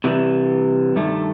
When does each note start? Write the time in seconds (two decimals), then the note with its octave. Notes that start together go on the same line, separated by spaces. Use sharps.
0.04 C3 E3 G3
0.96 G2 D#3 A3